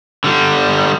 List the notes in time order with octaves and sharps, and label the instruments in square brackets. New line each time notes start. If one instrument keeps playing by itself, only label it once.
[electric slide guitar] D3 G3